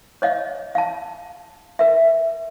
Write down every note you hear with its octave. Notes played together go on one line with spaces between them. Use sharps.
C#5 D#5 F5
F5 A5
A#4 E5